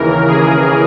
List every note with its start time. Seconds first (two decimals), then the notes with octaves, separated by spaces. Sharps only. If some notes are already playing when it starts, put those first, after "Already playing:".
Already playing: D#2 C#3 E3 A#4
0.28 G#4